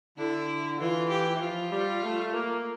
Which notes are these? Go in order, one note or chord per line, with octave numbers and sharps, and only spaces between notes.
D3 E4
E3 F4
G4
E3
F3 F4
G3
A3
A#3